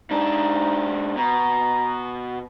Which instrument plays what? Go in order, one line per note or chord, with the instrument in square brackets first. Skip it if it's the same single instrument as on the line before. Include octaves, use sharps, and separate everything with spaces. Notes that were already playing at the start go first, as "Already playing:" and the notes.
[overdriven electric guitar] G#2 D4 [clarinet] D#4
[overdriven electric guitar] B2 [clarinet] A#5